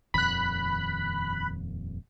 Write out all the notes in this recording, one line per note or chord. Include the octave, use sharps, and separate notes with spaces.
D#1 F2 D#3 B5 F#6